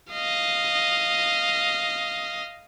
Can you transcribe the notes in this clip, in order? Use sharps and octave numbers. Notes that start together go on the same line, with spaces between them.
D#5 F5